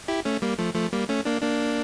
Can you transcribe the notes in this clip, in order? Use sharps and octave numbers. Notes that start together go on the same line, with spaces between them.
E4 G4
A3 C#4
G3 A#3
F3 A3
F3 A3
G3 A#3
A3 C#4
A#3 D4
A#3 D4